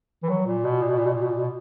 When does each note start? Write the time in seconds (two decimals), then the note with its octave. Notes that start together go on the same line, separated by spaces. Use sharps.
0.23 E3
0.29 F#3
0.46 A#2
0.64 B2
0.82 A#2
0.90 B2
0.98 A#2
1.06 B2
1.14 A#2
1.22 B2
1.31 A#2
1.39 B2